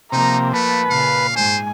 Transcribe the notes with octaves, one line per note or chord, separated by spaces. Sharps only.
C3 F3 A#3 D#4 A#5
A3 B4 A5
A#2 C#3 F5
G#2 G#3 C5 G#5